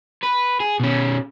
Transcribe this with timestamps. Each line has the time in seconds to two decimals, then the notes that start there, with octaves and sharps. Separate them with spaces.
0.23 B4
0.60 G#4
0.80 B2 C#4